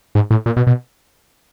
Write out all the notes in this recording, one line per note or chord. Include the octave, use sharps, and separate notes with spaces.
G#2
A2
A#2
B2
B2